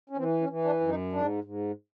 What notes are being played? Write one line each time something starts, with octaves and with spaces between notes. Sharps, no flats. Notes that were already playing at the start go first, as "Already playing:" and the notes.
C#4
E3 C4
C#4
E3
D4
F#2
D#4
G#2 D4
G#2